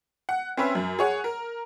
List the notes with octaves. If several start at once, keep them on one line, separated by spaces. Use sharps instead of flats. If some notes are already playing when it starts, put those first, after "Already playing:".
F#5
C4 C#4 B4 E5
F#2
G#4 C#5 F#5
A#4